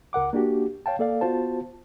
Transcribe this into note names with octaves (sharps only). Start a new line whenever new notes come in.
C#2 A#4 F#5 D6
A#3 D4 F#4 G4
C#5 F5 G5 A5
A#3 A4 D5 F5
B3 F4 F#4 C5 A5